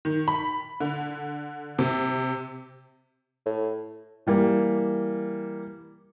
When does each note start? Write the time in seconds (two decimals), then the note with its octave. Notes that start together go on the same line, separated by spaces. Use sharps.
0.05 D#3
0.28 B5
0.81 D3
1.79 C3
3.45 A2
4.27 E3 G3 A#3